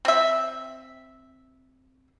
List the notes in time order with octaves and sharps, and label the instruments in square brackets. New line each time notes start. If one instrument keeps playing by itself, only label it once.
[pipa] C4 E5